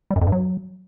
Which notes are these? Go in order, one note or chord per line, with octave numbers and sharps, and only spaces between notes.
G3
F#2
F2
G2
F#3